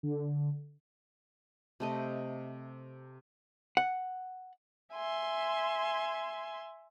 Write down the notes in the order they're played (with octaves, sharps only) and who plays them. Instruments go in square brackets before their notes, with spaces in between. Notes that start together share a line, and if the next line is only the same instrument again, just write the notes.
[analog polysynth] D3
[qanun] C3 A3 D#5
[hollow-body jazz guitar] F#5
[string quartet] E5 G#5 C6